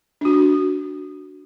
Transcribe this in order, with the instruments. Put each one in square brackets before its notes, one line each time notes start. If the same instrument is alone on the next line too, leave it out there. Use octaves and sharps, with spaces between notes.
[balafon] D4 F#4